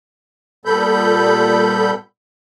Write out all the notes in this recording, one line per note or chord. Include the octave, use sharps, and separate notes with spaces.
A#2 G3 B3 A4 B5 G6